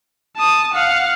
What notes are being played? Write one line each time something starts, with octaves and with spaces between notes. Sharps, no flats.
A5 D#6
F5 F#5